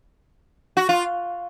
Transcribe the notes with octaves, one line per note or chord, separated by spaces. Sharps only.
F#4
F4